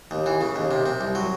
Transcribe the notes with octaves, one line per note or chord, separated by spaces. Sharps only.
D#2
E3
C#3
D#2
C3
C3
C2
F#3